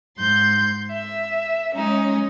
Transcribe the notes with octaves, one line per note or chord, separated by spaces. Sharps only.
G#2 C6 G6
E5
G#3 C#4 D#4